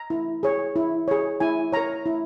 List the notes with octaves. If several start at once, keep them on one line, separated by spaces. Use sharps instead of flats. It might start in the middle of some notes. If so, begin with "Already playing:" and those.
Already playing: A#5
E4
G#4 C#5
E4
G#4 C#5
E4 G#5
A#4 C#5 A#5
E4